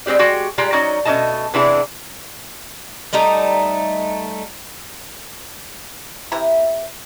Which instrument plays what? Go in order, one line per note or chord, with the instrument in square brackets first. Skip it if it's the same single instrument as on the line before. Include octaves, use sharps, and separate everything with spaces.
[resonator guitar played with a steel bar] G3 G#3 C4 G4 D5
G#3 F#4 G4 G5
G3 G#3 F4 G5 A#5
F#3 C#4 D#4 F#4 D5 D#5
B2 A3 C#4 D#4 D#5 A5
C3 E3 B3 D4 E4 G#4
[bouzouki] G3 A3 D#4 A#5
[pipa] C3 E4 E5 A#5